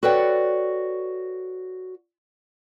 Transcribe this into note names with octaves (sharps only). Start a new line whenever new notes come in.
F#4 A4 B4 C#5 D5 G5